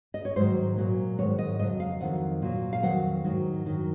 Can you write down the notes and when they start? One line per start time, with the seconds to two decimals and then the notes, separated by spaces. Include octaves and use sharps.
0.14 D#5
0.25 C#5
0.36 G#2 D#3 F#3 C5
0.77 A#2 F#3
1.18 G#2 D#3 F#3 C#5
1.39 D#5
1.59 F2 C#3 F#3 D#5
1.80 F5
2.01 F2 D#3 F#3 F#5
2.42 A#2 F#3
2.73 F5
2.83 F2 D#3 F#3 F#5
3.24 G#2 D#3 F#3
3.65 F#2 D#3 F#3